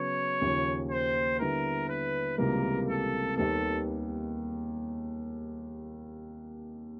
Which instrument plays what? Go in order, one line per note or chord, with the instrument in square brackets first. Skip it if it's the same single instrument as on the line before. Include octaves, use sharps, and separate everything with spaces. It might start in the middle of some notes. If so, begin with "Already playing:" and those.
Already playing: [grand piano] C#3 F#3 B3 [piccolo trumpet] C#5
[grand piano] D#2 C#3 F3
[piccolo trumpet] C5
[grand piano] D3 G3 B3 E4 [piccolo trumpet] A#4
[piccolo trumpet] B4
[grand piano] C#2 C3 E3 G3 A#3 [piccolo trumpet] A#4
[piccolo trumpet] A4
[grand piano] D#2 D#3 G3 B3 [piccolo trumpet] A4